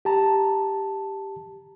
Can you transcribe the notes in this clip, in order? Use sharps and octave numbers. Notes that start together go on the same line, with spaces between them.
G4 A5 A#5